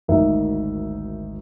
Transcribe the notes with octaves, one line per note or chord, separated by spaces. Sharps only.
G#1 D2 D#4 A#4 E5